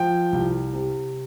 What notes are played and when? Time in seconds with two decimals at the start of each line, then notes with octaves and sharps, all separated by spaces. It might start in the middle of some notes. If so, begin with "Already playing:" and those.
Already playing: F3 G5
0.32 C2
0.73 C3